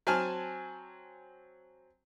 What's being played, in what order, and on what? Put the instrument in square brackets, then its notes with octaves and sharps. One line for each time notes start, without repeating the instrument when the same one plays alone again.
[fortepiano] F#3 C4 G#5 A5 F6